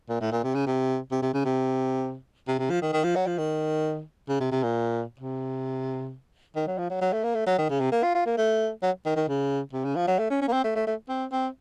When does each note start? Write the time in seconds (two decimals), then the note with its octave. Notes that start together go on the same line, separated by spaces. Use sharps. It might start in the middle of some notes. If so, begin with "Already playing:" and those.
0.09 A#2
0.21 A2
0.32 A#2
0.44 C3
0.55 C#3
0.66 C3
1.11 C3
1.22 C3
1.34 C#3
1.45 C3
2.48 C3
2.59 C3
2.70 F3
2.82 D#3
2.93 D#3
3.04 F3
3.15 F#3
3.27 F3
3.38 D#3
4.29 C#3
4.40 C3
4.52 C3
4.63 A#2
5.20 C3
6.55 D#3
6.67 F#3
6.78 F3
6.90 F#3
7.01 F#3
7.13 A3
7.24 A#3
7.35 A3
7.46 F#3
7.58 D#3
7.70 C#3
7.80 C3
7.92 A#3
8.03 F4
8.15 F4
8.26 A#3
8.37 A3
8.82 F#3
9.05 D#3
9.16 D#3
9.28 C#3
9.73 C3
9.85 C#3
9.96 F3
10.07 F#3
10.19 A3
10.30 C#4
10.41 C#4
10.48 A#3
10.53 C4
10.64 A3
10.76 A3
10.87 A3
11.09 C4
11.32 C4